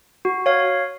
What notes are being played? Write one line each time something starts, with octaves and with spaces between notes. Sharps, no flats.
F#4
C#5 F5